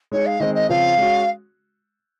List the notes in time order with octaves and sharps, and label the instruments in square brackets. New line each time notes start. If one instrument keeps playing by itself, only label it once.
[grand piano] G#3 D#4 G#4 [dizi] C#5
[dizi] F5
[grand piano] D#3 G#3 C4 [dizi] D#5
[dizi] D#5
[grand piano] C#3 F3 C4 [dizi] F5
[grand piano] G#3 C#4 F#4